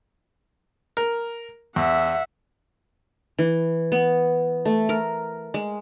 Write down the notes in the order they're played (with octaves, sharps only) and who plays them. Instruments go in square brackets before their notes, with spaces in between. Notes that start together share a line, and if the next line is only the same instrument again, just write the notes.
[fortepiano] A#4
[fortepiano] E2 [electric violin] E5 F#5
[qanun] E3
B3
A3
A#4
G#3